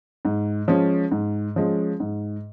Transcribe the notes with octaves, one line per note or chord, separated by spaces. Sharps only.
G#2
F3 G#3 C#4
G#2
F3 G#3 C#4
G#2